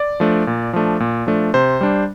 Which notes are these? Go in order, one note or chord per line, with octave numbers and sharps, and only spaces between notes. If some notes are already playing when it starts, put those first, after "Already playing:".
Already playing: D5
F3 A3 D4
A#2
F3 A3 D4
A#2
F3 A3 D4
C3 C5
G3 D4